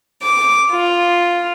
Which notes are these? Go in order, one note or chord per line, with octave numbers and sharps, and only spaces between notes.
D6
F4